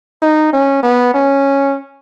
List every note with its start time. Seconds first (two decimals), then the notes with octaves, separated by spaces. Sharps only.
0.22 D#4
0.53 C#4
0.83 B3
1.14 C#4